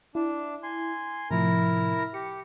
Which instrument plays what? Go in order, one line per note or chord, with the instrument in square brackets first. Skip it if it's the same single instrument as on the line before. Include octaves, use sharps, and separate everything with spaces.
[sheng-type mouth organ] D4 [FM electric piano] E4
[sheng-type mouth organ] G#5 C6
[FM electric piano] A2 C3 F3 [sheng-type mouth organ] E4 A#4 A#5
[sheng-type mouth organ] G4 [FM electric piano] C#7